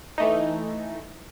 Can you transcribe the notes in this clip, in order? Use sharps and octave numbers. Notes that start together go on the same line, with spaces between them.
E3 A3 D#4